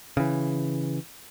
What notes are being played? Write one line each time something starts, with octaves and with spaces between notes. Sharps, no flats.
C#3 E3